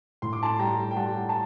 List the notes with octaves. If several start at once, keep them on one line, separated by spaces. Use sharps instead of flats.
A2 C6
D6
A5 C6
G3 G5 A#5
G5
G3 F#5 A5
A5